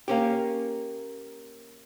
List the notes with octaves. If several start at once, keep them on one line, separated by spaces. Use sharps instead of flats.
A#3 C#4 G4